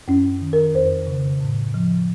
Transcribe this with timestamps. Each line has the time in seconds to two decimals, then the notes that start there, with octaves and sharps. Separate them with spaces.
0.08 F#2 C#4
0.42 D#3
0.53 A#4
0.74 F2 C5
1.07 C#3
1.40 A2
1.74 F3